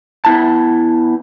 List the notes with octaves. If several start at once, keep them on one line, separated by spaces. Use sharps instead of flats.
B3 E4 A5